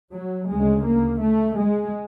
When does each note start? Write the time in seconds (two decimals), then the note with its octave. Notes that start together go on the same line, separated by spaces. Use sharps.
0.14 F#3
0.50 D2 C#3 G#3
0.86 A#3
1.21 A3
1.58 G#3